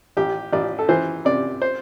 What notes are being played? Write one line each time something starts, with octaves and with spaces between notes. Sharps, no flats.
A1 G4
A1 D5
A4
E3 C5
C3 D5
C5